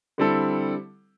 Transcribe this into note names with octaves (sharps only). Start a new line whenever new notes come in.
D3 G3 C4 E4 A4